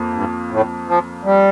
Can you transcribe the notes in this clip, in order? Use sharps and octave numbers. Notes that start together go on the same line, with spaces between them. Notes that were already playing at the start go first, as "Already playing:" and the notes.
Already playing: F2 A#3
G2
A2
F3
G3